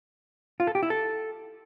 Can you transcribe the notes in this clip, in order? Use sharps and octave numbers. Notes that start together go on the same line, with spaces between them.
F4
A4
G4
E4
A4